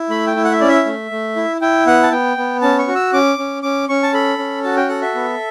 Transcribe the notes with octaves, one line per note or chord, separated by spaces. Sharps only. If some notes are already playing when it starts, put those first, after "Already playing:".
Already playing: E4
A3 B5
G5
E4
F#5
E5
C#4 D5
E5
A3
A3
E4
E4 G5
B3 F#5
A5
B3 G5
B3
C#4 A5
C#6
F#4
E6
C#4 D6
C#4
C#4 D6
C#4 C#6
A5
A4 B5
C#4
F#4 A5
G5
A4 F#5
E5
B3